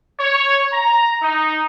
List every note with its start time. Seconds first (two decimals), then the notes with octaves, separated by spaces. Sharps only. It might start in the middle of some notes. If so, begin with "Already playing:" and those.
0.19 C#5
0.72 A#5
1.22 D#4